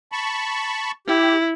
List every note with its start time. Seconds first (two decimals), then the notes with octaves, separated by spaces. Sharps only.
0.12 A5 B5 C#6
1.07 E4 G4